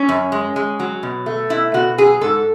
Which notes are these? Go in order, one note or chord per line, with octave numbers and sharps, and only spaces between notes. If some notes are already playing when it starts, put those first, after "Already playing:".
Already playing: C#4
F#2
G#3
G#3
F#3
B2
A3
B2 E4
B2 F#4
F#3 G#4
G#2 A4